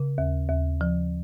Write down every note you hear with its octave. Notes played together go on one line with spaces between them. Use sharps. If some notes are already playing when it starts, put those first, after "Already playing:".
Already playing: C#3
D#2
D#2
F3